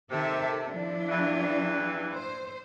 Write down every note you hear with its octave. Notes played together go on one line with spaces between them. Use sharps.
C3 D#3 A4 E5
F3 D4 E4
E2 G2 E3
C5